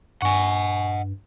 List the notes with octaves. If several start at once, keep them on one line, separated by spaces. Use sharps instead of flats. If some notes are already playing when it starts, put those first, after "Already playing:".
G2 D#5 F#5 G#5 C#6